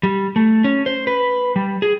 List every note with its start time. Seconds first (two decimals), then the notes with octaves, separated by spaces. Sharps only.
0.03 G3
0.36 A3
0.64 C#4
0.86 C5
1.07 B4
1.56 G3
1.82 G#4